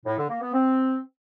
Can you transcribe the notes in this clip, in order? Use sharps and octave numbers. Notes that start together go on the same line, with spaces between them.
A2
D3
A#3
B3
C4